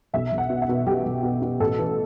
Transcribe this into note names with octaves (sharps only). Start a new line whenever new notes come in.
B1 E5
B1
F#5
B2
E5
B2
B1 G4
B1
B2
B2
A1 A4
E3